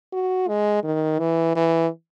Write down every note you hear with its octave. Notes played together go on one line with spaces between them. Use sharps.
F#4
G#3
D#3
E3
E3